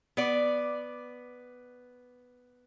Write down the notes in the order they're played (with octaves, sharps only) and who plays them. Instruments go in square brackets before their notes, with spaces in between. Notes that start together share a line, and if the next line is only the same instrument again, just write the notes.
[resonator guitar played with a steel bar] B3 D5